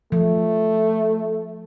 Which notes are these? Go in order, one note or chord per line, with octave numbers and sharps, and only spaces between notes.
F3 A3